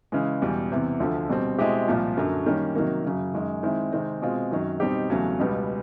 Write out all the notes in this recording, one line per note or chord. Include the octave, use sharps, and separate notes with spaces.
C#3 E3 G#3
E2 B2 G3
E2 C3 E3
D2 D3 F3
B2 G3 C4
B2 G#3 C4 E4 G4
C2 A#2 F3
F#2 D3 F#3 A#3
D#3 G3 A#3 C#4
C3 D#3 F#3 A#3
F#2 C#3 F#3
F#2 D#3 G#3
D#3 G#3 C4 E4
C3 D#3 G#3 C4
B2 G#3 C4 F4
F#2 D#3 F#3
B2 G3 C4 D#4 G4
E2 C#3 F#3 A3
C#2 B2 G3 B3